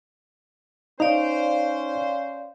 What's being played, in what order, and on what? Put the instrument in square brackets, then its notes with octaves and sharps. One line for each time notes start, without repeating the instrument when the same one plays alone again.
[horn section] C#4 C5 [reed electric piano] D#4 [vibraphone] D5 F5